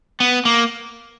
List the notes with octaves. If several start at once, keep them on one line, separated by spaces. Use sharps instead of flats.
B3
A#3